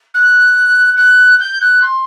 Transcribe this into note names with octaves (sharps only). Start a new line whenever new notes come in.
F#6
F#6
G6
F#6
C6